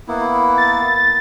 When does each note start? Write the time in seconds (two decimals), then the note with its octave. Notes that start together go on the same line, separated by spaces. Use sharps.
0.08 A#3 B3 E4
0.58 A6